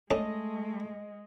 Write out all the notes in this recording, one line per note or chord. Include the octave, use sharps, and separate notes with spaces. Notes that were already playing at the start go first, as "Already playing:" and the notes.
G#3 A3 C#4 D4 A4 D#5